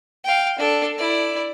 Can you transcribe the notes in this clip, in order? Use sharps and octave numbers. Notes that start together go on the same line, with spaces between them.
F5 G5
D4 A4
E4 D5